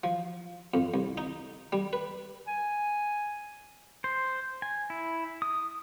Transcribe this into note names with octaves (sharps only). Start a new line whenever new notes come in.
F3
F2
C2
D#4
G3
B4
G#5
C5
G#5
E4
D#6